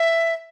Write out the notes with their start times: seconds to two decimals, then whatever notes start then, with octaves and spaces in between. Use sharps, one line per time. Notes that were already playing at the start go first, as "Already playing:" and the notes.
Already playing: E5